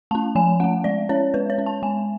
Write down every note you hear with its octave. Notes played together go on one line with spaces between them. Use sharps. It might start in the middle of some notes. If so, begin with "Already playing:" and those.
A3 C#4 A5
F3 G#5
A3 C#4 F#5
G#3 D5
C#4 C#5
G#3 B4
C#5
C#4
A5
G#3 G#5